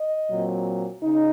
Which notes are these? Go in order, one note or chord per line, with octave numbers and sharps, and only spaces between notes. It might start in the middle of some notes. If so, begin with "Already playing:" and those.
Already playing: D#5
A#2 F#3 C4
C#3 D#4